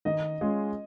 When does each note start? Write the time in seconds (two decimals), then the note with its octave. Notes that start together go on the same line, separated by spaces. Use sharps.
0.05 D#3 D#5
0.41 G#3 C#4 F4 G#4